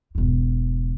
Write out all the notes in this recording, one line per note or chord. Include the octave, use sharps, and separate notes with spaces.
E1 G#2